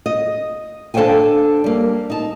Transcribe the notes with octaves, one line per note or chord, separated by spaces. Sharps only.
D#5
D4 A4 C5 F5 G5 G#5
G3 A#3
D#4 A5